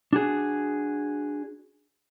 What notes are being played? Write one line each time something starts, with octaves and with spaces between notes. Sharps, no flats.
D4 F#4 G#4